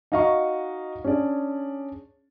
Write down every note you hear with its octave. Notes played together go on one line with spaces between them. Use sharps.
D#4 F#4 D#5 F5 A#5 C#6
C#4 D4 G#4 D5